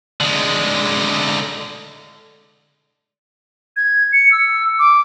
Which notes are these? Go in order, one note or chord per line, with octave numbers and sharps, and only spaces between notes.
D3 G#3
G#6
C#7
E6
D6